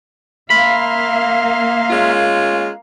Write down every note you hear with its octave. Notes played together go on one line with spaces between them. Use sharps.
A#3 E5 F5 B5 C6 F6
G#3 C#4 F4